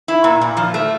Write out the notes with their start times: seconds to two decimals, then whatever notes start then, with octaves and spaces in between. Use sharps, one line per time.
0.08 E4
0.24 A#2
0.41 A#2
0.57 F3
0.74 A3